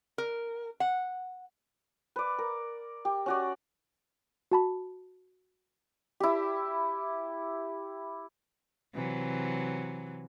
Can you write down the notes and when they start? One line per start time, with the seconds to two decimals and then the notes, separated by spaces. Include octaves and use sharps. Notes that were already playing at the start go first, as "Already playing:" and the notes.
0.18 A#4
0.80 F#5
2.16 B4 D5
2.38 A#4
3.05 G4
3.26 C#4 F#4 D5
4.51 F#4 A5 B5
6.20 E4 G4
8.94 C3 E3 F#3